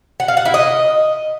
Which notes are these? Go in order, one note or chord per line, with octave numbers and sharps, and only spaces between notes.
F#5
F5
F#5
E4
D#5